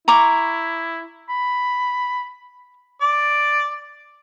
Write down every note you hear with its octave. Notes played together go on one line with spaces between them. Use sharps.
E4 A#5 C#6 D6
B5
D5